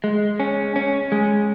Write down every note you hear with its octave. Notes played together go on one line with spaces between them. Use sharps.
G#3
C#4
C#4
G#3